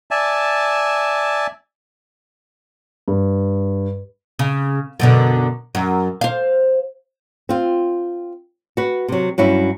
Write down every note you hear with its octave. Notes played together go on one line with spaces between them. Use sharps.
D5 E5 G#5 A5
G2
C#3
F#2 B2 D3
F#2
C5 F5
C4 F4
F#4 B4
C3 F#3
G2 F#3 C#4 E4